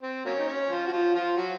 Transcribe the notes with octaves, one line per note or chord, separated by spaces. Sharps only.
C4
F#3 A#3 C#4
D#4
C#4
F3 F4
F#4
F3 F4
F3 F4
F#3 F#4